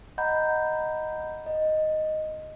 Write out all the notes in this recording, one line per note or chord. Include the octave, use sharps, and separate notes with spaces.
D#5 F#5 A#5 B5 G6
D#5